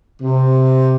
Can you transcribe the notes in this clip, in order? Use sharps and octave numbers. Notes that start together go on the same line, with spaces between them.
C3